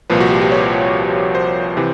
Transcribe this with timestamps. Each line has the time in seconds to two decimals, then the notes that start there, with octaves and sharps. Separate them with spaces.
0.10 C2 A#2 F3 B4
0.20 F#4
0.30 G4
0.41 G4
0.52 C#5
1.35 C5
1.77 C3 E3